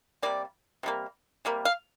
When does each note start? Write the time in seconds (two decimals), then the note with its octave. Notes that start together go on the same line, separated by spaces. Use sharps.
0.22 C3 G3 A#3 D5
0.83 C3 G3 A#3
1.45 C3 G3 A#3
1.65 F5